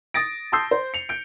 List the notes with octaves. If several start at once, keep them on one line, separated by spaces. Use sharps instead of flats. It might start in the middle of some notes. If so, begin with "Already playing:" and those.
D#6 A6 A#6 D7
A5 C6 D#6 E6 G6 C7
C5
C#7 F7
G6 D7